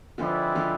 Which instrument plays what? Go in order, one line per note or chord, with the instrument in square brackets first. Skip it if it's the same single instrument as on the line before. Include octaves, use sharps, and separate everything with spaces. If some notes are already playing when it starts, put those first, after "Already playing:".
[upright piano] D3 F3 [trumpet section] G#3 C4 E4 B4 D5
[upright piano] D3 F3